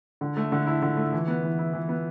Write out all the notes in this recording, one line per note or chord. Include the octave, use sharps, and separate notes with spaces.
D3
A3
D3
E4
D3
A3
E3
B3
E3
E4
E3
B3